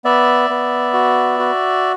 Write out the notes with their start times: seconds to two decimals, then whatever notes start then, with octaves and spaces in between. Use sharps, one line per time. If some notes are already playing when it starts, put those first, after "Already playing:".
0.05 B3 D5 E5
0.50 B3
0.94 F#4
1.39 F#4